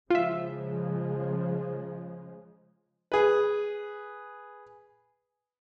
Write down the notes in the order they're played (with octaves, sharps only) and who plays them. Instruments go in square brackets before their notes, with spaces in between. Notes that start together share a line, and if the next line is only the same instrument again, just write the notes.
[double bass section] C#3 F3 G#3 [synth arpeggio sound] F4 E5
[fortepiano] G#4 B4